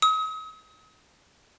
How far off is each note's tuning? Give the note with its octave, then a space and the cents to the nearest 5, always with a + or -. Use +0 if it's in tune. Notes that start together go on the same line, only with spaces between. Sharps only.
D#6 +40